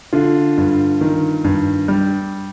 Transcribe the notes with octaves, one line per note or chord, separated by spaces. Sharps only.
D3 F4
G2
D#3
G2
G3